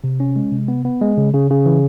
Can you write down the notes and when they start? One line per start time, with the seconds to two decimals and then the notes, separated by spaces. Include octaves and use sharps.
0.04 C3
0.20 C#4
0.36 G#3
0.52 C3
0.68 B3
0.85 B3
1.02 G#3
1.17 C#3
1.34 C#3
1.50 C#3
1.66 E3